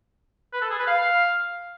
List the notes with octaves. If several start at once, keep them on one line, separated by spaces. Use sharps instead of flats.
B4
A4
G#4
B4
F5